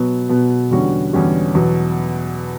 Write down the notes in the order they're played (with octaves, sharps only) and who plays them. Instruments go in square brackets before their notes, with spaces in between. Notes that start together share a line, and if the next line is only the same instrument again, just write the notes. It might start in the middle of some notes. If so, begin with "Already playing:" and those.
Already playing: [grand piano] B2 F#3 B3
B2 F#3 B3
E2 D3 G3 C#4 F#4
E2 D3 G3 C#4 F#4
E2 B2 F#3